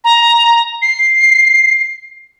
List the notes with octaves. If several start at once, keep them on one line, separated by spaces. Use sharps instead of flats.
A#5
C7